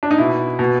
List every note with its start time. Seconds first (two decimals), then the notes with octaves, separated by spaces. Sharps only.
0.03 D4
0.11 D#4
0.18 B2 E4
0.59 B2